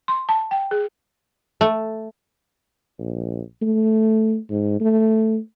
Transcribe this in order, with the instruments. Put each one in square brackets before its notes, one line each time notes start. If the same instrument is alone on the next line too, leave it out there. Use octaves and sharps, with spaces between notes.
[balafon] C6
A5
G5
G#4
[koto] A3
[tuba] A#1
A3
G#2
A3